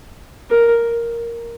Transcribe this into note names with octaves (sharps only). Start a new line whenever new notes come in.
A#4